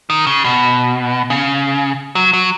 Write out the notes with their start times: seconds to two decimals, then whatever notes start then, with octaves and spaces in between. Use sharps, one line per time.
0.10 D#3
0.27 C#3
0.44 B2
1.30 C#3
2.15 F#3
2.33 F#3